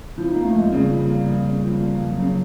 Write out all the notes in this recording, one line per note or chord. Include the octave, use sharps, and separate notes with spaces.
F3 E4
A#3 D#4
A3
F2 G#3
C#3 G3
F3
A#3
F2
C#3
F3
A#3
F2
F#3
C#3